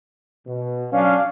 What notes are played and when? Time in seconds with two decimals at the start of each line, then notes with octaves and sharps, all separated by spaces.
0.47 B2
0.92 F#3 C#4 D4 F5